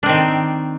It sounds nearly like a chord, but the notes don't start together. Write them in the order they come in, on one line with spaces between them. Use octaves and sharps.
D4 C4 D#3